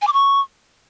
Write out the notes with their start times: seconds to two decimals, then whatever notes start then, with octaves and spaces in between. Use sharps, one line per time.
0.02 G#5
0.07 D6
0.13 C#6